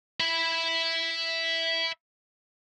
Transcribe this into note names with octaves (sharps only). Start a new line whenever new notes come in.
E5 B5